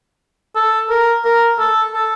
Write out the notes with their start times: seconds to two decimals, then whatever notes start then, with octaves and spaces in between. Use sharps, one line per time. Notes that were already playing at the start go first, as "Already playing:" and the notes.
0.56 A4
0.90 A#4
1.24 A#4
1.59 A4
1.93 A4